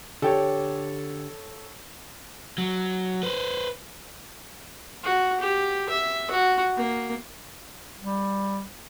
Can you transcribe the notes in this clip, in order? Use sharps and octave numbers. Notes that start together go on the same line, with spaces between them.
D3 G4 A4 C#5
F#3
B4 C5
F#4
G4
E5
F#4
A#3
G3